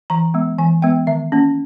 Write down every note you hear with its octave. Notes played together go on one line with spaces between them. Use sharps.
E3 A#5
G#3 B3
E3 G#5
G#3 B3 G5
D#3 E5
A#3 C#4